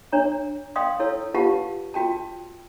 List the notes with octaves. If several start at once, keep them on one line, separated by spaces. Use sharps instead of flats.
D4 C#5 A#5
D5 F5 G5 C6 D#6
E4 A4 C#5 E6
F4 G4 B4 F5 F#5 A5
F4 F#4 G5 A5